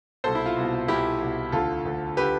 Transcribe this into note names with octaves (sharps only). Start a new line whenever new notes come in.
C2 B2 A4 C5
E4
F4
C2 B2
C2 B2 E4 G4
C2 B2
D2 D3 F4 A4
D2 D3
D3 G4 B4